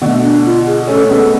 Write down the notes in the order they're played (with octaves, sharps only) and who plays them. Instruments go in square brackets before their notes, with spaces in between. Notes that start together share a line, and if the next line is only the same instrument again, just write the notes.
[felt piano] B2 D3 [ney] A3
[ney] D4
F4
G#4
[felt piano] A3 C#4 [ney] A4
[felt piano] C#4
[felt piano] G#3 B3 [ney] A4